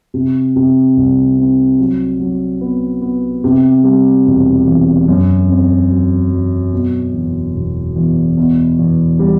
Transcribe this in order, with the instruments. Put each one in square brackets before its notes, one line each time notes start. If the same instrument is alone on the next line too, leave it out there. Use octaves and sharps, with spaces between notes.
[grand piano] C3
C3
C2
C4
F#3
F#3
B3
B3
C3
G3
E1
E2
F#2
C4
F#3
F#3
B2
E1
E1
E2
B2
E2
G3